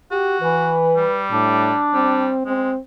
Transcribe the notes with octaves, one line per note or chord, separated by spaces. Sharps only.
F#4 G4
E3 B4
G3
A2 D4
G3 C4
G#3 C4